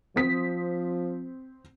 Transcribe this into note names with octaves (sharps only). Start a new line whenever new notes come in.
F3 C4 D#6 B6